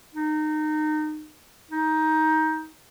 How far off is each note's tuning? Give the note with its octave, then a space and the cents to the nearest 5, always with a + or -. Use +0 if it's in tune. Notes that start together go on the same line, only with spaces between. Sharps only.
D#4 -25
D#4 +15